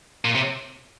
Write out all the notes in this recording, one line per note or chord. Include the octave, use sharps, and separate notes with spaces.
A#2
C3